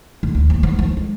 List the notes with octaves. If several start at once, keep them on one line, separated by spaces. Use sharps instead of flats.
E2
D2
D#2
B3
F3
G#3